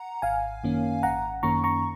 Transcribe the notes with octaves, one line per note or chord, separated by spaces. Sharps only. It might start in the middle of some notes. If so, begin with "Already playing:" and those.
Already playing: F#5 A#5
G#1 F5 G#5
F#2 D#3 A#3 C#4
G#1 F#5 A#5
F#2 D#3 A#3 C#4 A#5 C#6
A#5 C#6